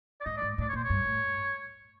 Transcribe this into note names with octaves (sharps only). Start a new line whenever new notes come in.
D5
G#2 D#5
G#2 D5
A2 D5
C#5
A#2 C5
C#5
G2
A2